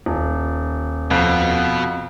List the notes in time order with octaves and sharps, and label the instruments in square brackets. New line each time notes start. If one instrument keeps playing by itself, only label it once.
[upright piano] D#1
[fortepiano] F2 [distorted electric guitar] B2